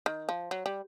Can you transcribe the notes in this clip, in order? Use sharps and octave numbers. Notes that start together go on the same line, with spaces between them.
D#3
F3
F#3
G3